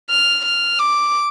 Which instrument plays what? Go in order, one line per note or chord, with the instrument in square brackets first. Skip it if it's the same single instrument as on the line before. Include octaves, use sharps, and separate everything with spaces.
[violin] F6
F6
D6